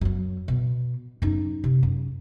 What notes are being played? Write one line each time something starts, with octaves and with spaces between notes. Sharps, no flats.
F#2 F#3
B2
F#2 D#4
C3
F#2